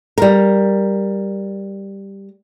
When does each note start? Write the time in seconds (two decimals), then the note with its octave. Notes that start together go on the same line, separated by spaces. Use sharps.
0.18 G3 A#4